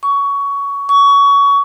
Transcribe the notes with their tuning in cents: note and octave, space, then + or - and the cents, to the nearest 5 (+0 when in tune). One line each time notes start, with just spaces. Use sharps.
C#6 +20
C#6 +25